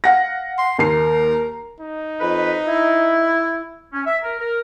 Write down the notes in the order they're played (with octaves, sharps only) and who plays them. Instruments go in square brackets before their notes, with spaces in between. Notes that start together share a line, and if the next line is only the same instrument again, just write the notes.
[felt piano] F5 F#5 A#6
[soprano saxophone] C6
[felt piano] D#2 C7 [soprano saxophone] A#4
[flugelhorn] D#4
[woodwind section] F2 B4
E4
C#4
E5
A#4
A#4